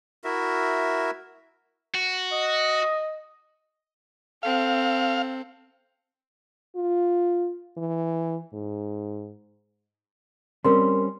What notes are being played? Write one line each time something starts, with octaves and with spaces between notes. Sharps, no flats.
E4 F#4 A#4 E5
F#4
D#5
C4 A4 F5
F4
E3
G#2
G3 C4 C#4 A#4 C6